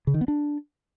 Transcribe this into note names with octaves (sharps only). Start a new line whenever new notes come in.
C#3
D#3
B3
D4